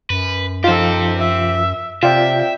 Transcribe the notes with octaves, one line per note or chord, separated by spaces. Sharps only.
F#2 B4
F3 D#4 F4 G4 A4 C5
E5
C3 C4 F4 D5 E5 G5